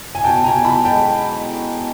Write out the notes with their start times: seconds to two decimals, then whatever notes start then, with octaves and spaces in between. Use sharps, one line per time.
0.15 G#5
0.24 B2 G5 A5
0.44 B2 G#5 A#5
0.64 B2 A5 B5
0.85 G#3 G5 A5